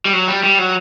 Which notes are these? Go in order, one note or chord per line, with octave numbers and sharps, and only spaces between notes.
G3
F#3
G3
G3
F#3